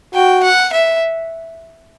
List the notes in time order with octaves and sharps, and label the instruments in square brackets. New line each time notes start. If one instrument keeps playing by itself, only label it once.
[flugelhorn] F#4 [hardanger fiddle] G5
[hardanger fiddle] F#5
E5